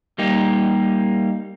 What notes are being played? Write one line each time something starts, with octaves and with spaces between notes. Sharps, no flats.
G3 A#3 D#4 G4